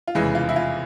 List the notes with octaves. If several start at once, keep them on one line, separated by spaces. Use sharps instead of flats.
F4
F1 E2 C#3 E3 G#3 E4
F4
E4
F4